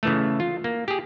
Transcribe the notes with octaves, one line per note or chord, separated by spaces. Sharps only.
C#3 E3 A3
F4
A#3
G4 G#4